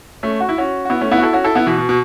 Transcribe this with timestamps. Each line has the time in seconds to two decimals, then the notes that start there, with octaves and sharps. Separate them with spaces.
0.23 A3 C#4
0.40 F#4
0.49 E4
0.58 C#4 F#4
0.85 F#4
0.90 B3 E4
1.01 A3 C#4
1.11 B3 E4
1.18 F#4
1.22 E4 A4
1.33 C#4 F#4
1.44 E4 A4
1.55 B3 E4
1.66 B2 E3
1.78 B2
1.89 B2